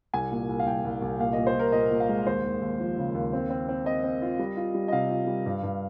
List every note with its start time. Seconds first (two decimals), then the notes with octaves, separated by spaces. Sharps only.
0.13 C2 G#5
0.31 A#2
0.49 C2
0.59 F5
0.66 C2 G5
0.85 C2
1.02 C2
1.19 A#2 F5
1.33 A#2 D#5
1.47 C5
1.55 A#2 A#4
1.72 A#2 D#5
1.91 A#2
2.00 F5
2.09 G#3
2.26 D#2 C5
2.44 D#2
2.62 D#2
2.79 F3
2.98 C#3
3.14 D#2
3.33 C4
3.50 C4
3.69 C4
3.85 C4 D#5
4.04 C4
4.22 F4
4.39 G3
4.57 F4
4.74 G3
4.88 D#5
4.92 C3 F5
5.11 F4
5.27 G3
5.46 G2
5.63 G2